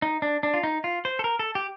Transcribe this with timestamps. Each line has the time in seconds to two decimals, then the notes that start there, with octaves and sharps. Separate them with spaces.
0.02 D#4
0.22 D4
0.43 D4
0.54 F4
0.63 D#4
0.84 F4
1.05 C5
1.19 A4
1.24 A#4
1.39 A4
1.55 G4